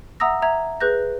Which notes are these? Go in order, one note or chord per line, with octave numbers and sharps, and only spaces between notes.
E5 F#5 A#5 D#6 E6 A#6
E5 A#5 G#6
G#4 B4 F#6 G6 A#6